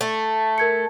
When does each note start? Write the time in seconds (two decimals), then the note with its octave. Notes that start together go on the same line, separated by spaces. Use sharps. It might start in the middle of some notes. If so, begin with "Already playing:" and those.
0.01 A3
0.58 A#4 G#6 C#7